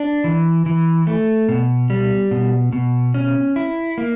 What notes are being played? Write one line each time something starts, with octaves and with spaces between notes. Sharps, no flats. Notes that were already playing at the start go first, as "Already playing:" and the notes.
Already playing: D4
E3
E3
A3
B2
G3
B2
B2
C#4
E4
A#3